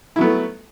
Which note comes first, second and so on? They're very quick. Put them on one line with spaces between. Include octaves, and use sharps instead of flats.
E4 F#3 B3 A3